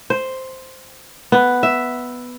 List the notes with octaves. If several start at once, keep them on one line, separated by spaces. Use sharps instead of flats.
C5
B3
E5